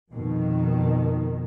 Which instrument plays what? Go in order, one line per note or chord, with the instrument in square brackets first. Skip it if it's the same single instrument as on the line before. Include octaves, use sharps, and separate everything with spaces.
[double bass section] F2 B2 D#3